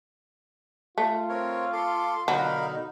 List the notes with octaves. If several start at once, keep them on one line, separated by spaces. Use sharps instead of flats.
A3 F4
C4 A#4 C#5
A4 C6 D6
B2 D3 F#3 D#4 A#4 F5 B5